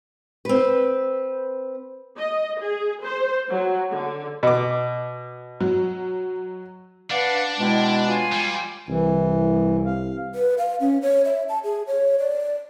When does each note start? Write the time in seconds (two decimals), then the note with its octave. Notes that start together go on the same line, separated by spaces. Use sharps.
0.45 C4 B4
2.18 D#5
2.60 G#4
3.04 C5
3.49 F#3
3.92 D3
4.43 B2 D6
5.60 F#3
7.10 D4 B4 D5 F5 F#5
7.59 B2 G#3 E4 G5
8.07 F4 G#5
8.33 G3
8.89 C2 E3
9.86 F5
10.35 B4
10.58 F5
10.81 C#4
11.02 C#5
11.25 E5
11.49 A5
11.64 G#4
11.87 C#5
12.19 D5